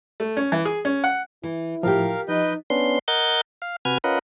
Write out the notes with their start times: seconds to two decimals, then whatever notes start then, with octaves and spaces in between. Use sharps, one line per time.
0.20 A3
0.37 C#4
0.52 E3
0.65 G#4
0.85 C#4
1.04 F#5
1.43 E3 E4
1.83 A2 F3 F4 G4 A#4 F5
2.28 F3 D#4 B4 D#5 G6
2.70 B3 C#4 D4 C6
3.08 A#4 D#5 F#5 G6 A6
3.62 F5
3.85 C3 F#4 B4 G#5 F6 G#6
4.04 C#4 F4 A#4 B4 D#5 F#5